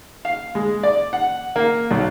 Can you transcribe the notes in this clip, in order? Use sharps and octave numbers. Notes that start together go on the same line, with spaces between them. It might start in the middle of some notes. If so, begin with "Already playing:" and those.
F5
G#3
D5
F#5
A#3
B1